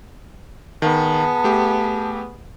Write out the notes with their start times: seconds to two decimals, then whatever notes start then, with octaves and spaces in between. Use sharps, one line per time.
0.82 D#3 B3 G#4 A5
1.44 A3 G4